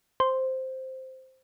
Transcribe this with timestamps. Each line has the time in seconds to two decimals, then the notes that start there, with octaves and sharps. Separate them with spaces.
0.20 C5